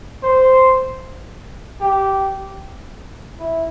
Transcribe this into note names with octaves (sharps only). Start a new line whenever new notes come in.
C5
G4
E4